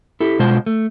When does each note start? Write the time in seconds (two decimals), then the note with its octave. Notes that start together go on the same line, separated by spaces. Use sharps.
0.20 E4 G4 A4
0.39 B2 G#3 F4 C5 A5
0.66 A3